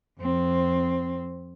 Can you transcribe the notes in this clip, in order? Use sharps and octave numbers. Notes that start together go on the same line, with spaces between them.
F2 C4